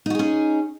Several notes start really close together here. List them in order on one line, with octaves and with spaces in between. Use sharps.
D#4 F#4 G#4 C#4